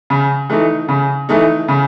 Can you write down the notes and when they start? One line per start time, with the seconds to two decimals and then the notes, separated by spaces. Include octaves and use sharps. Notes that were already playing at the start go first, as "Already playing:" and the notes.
0.10 C#3
0.50 E3 A3 D#4
0.89 C#3
1.29 E3 A3 D#4
1.68 C#3